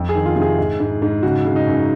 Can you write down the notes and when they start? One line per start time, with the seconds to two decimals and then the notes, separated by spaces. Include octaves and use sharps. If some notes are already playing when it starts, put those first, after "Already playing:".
Already playing: F2
0.09 G#4
0.15 D#3
0.26 F4
0.36 C3
0.42 G#4
0.59 G#2
0.80 G#2
1.02 G#2
1.23 C#3 F#4
1.45 C#3
1.56 D#4
1.67 F#2